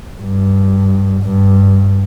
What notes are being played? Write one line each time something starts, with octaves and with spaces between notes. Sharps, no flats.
G2
G2